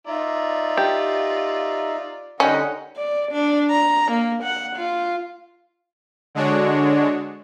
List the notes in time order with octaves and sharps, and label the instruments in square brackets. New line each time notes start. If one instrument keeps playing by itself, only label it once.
[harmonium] D#4 E5 A#5 [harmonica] F4 D5
[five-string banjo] G4
[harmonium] D3 D#4 F#5 [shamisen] G3 C#4 [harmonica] A#4 D#5
[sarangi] D5
D4
A#5
A#3
F#5
F4
[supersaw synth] D3 G#3 D4 F#4 C#5